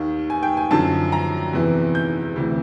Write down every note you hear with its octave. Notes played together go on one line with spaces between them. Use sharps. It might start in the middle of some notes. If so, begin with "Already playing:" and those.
Already playing: D#2 D#3
G#5
G5
G#5
F#2 D3 F3 A5
A#5
E2 C3 E3
G6
D2 C3 E3